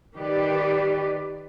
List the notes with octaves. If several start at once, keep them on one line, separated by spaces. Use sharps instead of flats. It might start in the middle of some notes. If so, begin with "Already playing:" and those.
D#3 G4 B4 D5